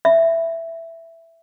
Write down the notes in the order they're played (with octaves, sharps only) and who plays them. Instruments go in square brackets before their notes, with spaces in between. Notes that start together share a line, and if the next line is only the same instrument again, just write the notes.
[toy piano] E5